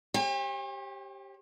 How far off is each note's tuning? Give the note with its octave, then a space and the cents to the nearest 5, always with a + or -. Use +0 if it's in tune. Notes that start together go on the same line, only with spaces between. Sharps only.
G4 +0 C#5 -45 G5 +45